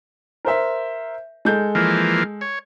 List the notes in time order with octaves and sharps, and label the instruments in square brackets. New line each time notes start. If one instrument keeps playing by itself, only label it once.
[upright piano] A#4 C5 E5
G#3 A4 G6
[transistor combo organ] E3 F3 A#3
C#5